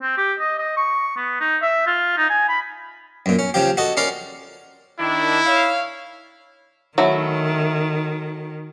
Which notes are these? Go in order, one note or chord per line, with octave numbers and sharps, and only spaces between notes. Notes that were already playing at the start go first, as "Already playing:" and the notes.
C4
G4
D#5
D#5
C#6
B3
D#4
E5
F4
D#4
G#5
B5
F#2 A#2
C#4
C#3 F3 G4
F#4 A4 D#5
C#4 A#4 D5 C6
D#3 D4 E4
C#5 F5
D#3 F#3 A3 E4